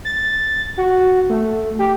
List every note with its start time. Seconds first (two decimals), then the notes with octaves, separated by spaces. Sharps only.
0.05 A6
0.78 F#4
1.30 A3
1.79 G4